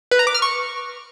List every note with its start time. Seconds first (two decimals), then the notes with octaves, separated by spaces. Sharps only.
0.11 B4
0.19 A#5
0.27 D6
0.35 F6
0.42 C#6